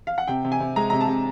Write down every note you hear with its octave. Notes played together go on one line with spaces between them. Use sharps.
F5
F#5
C3 G5
C3
G#5
C3
G#3 A#5
C3 A#5
A5
C3